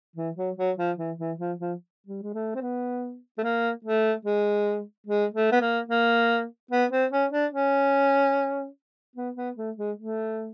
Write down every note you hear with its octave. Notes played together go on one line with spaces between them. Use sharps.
E3
F#3
F#3
F3
E3
E3
F3
F3
G3
G#3
A3
C4
B3
A3
A#3
A3
G#3
G#3
A3
B3
A#3
A#3
B3
C4
C#4
D4
C#4
B3
B3
A3
G#3
A3